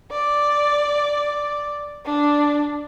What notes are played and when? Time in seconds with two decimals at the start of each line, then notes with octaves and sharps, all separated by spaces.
0.11 D5
2.06 D4